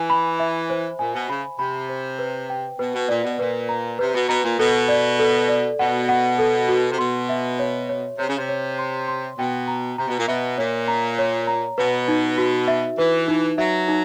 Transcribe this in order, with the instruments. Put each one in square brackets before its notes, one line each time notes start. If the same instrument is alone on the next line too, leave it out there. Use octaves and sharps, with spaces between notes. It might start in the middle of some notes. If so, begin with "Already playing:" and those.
Already playing: [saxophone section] E3 [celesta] G#5
[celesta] B5
E5
C5
[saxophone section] A#2 [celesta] G#5
[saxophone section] B2
[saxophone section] C#3 [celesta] B5
[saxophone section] C3 [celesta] B5
[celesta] C5
B4
G5
[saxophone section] B2 [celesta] B4
[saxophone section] B2
[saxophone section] A#2 [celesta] D5
[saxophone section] B2
[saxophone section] A#2 [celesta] B4
[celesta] A#5
[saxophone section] C3 [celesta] B4
[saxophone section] B2
[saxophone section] B2 [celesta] A#5
[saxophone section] A#2
[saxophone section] B2 [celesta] A4
[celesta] D5
A4
D5
[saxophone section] B2 [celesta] F#5
[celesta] F#5
A4
F#4
[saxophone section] C3
[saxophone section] B2 [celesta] C6
[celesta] E5
C#5
C#5
[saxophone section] C3 [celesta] C#5
[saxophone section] C#3
C3
[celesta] C#5
C6
C6
[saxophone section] B2 [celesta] G5
[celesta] A#5
[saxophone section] C3 [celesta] A#5
[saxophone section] B2
A#2
[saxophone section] B2 [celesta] E5
[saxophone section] A#2 [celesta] C#5
[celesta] A#5
C#5
A#5
[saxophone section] B2 [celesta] B4
[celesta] D#4
F#4
E5
[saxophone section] E3 [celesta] B4
[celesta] D#4
[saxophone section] F#3 [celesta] E5
[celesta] D#4